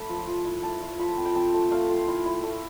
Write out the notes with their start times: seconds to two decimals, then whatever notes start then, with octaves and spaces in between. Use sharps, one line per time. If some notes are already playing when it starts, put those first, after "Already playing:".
Already playing: A3 B5
0.09 F3
0.27 F3
0.45 E4
0.63 A3 A5
0.81 F4
0.99 F3 B5
1.17 C4
1.25 G5
1.35 C4 A5
1.54 A3
1.71 A3 F5
1.89 F4
2.08 E4
2.26 E4
2.43 A3